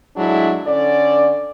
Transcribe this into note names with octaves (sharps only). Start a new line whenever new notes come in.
A2 F#3 G#3 D4 E4
D3 C#4 D5